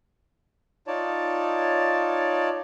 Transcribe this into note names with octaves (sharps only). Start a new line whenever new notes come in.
D#4 F4 C#5 D5 A5